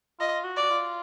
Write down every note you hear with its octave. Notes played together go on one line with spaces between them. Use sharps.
F4 D#5
F#4
F#4 D5
F4